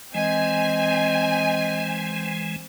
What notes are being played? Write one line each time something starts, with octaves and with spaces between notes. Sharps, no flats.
E3 G#3 C4 D#5 G#5